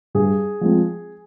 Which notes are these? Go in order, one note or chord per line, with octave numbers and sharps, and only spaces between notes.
G2 G#4
F3 G#3 C4